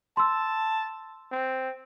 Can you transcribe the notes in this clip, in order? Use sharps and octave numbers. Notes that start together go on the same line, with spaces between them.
A5 C6 E6
C4